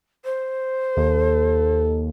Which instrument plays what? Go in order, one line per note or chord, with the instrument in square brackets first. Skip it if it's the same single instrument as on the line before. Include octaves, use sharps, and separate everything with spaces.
[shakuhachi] C5
[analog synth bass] D#2 [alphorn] A4